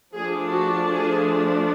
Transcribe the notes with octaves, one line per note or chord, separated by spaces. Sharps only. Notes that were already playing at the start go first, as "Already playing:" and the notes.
F3 A3 D4 G#4
F#4
G#4